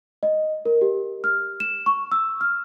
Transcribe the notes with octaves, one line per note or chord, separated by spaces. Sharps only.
D#5
A#4
G4
F6
E7
C#6
E6
F6